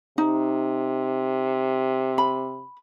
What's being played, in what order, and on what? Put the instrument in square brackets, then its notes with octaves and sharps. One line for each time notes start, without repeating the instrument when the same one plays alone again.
[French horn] C3 [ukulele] D#4
[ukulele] B5